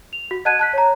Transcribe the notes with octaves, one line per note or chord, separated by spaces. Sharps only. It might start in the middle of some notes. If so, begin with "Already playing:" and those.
F7
F#4
D#5 F#5 A5 F#6 G#6 D#7
A5 F#6 B6
C#5 A#5